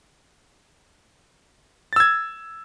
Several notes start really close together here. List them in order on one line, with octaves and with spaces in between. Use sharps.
A6 E6 G#6